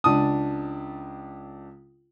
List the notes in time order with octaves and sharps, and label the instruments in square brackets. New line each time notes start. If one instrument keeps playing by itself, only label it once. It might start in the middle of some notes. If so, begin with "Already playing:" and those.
[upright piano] C#2 D4 A5 D#6